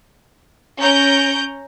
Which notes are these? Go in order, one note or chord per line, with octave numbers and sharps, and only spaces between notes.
C#4 A#5 G6 D7